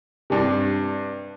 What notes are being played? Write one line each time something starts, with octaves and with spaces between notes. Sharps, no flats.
G2 C3